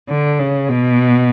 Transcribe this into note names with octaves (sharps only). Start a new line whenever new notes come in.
D3
C#3
B2